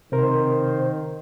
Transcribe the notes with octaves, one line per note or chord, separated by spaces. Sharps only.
C3 D#3 A#4 C5